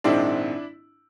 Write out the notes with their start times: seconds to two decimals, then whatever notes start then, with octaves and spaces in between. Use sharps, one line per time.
0.04 A#1 G#2 D#3 G#3 C4 D4 E4